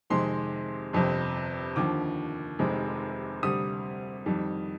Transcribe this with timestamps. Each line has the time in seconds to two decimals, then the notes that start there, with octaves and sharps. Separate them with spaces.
0.10 F2 C3 D#3 G#3 C6
0.93 G1 F2 C3
1.76 D#2 D3 F3 D6
2.59 F1 F2 C3 D#3 G#3
3.43 D2 C3 G3 D#6
4.26 F2 D#3 G3